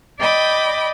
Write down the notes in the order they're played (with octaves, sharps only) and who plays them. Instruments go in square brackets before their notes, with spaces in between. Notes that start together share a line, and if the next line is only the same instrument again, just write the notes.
[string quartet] D5 D#5 G5 B5 D6